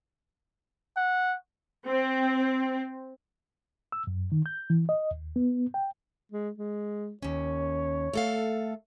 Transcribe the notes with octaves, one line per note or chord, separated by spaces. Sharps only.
F#5
C4
E6
F#2
D#3
G6
E3
D#5
D#2
B3
G5
G#3
G#3
D#2 C#4 C#5
A3 A4 F5